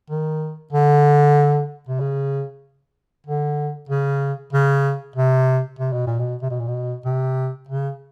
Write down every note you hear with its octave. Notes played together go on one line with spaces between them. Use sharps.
D#3
D3
C3
C#3
D3
C#3
C#3
C3
C3
B2
A#2
B2
C3
B2
A#2
B2
C3
C#3